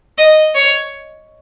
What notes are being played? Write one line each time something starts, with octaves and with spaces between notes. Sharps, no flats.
D#5
C#5